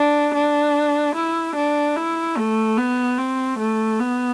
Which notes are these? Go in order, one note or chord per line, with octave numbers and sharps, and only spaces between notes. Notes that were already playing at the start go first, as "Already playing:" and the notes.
Already playing: D4
D4
E4
D4
E4
A3
B3
C4
A3
B3